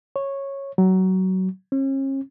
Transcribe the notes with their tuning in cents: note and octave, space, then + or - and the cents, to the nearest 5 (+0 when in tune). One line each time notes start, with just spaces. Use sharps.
C#5 -10
F#3 +20
C#4 -40